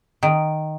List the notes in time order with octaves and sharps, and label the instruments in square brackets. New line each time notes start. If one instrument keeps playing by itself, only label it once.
[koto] D#3